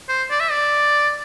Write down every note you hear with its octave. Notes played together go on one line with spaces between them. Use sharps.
C5
D5
E5
D5